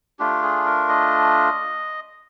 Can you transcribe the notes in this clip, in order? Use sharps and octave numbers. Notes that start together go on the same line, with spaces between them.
A3 D4 F4 G4
G#4
A#4
D#5